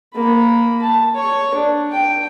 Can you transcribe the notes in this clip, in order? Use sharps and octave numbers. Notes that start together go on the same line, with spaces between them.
A#3 B5
A5
C#5 C#6
D4
G5